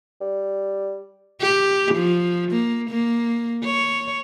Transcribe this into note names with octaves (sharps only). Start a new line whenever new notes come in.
G3
G4
F3
A#3
A#3
C#5